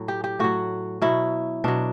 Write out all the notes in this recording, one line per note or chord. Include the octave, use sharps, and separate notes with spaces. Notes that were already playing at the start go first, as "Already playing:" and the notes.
Already playing: A2 F#3
G4
G4
A2 F#3 F#4
B2 F#3 E4
B2 F#3 D4